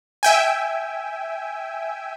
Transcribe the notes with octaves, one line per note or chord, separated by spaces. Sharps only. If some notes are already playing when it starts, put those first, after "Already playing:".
E5 G5 G#5